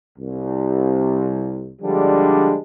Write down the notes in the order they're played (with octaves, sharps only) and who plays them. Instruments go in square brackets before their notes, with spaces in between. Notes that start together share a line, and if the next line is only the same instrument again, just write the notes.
[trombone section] C2
D3 F3 G3 G#3 D4